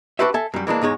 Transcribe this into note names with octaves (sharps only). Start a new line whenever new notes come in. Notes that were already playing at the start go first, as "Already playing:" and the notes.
D4 F#4 G4 B4 C5 E5
A4 E5 G#5
F#2 G3
E3 G#3 A#3 D4
E2 G#2 G#3 C#5